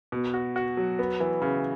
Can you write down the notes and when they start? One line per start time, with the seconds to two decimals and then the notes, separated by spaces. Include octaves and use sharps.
0.12 B2
0.34 F#4
0.56 F#4
0.77 F#3
0.99 B3
1.20 E3
1.42 C#3